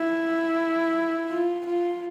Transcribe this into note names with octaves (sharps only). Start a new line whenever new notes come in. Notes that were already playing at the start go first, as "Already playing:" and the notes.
Already playing: E4
F4
F4